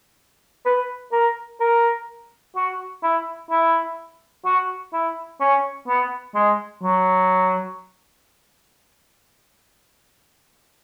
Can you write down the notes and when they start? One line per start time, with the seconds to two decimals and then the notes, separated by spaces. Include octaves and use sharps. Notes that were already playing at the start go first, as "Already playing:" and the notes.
0.66 B4
1.12 A#4
1.60 A#4
2.56 F#4
3.03 E4
3.50 E4
4.45 F#4
4.93 E4
5.40 C#4
5.88 B3
6.35 G#3
6.83 F#3